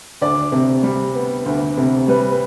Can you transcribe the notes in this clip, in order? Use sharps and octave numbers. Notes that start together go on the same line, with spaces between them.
D2 D5
C3
G3
B3
D2
C3
G3 B4
B4